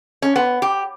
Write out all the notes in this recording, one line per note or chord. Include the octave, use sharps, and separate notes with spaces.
C#4
B3
G4